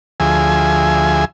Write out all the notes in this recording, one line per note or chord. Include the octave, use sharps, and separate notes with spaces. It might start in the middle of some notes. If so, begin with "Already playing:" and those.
D2 F3 G#4 E5 G#5